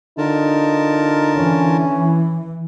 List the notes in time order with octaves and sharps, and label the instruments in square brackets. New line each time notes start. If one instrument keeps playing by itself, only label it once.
[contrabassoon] D3 [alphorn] D#4 [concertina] F4 A#4 A5
[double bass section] E3 [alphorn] C#4